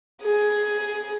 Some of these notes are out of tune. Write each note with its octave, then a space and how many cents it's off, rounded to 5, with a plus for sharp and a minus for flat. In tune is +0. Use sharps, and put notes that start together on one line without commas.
G#4 +10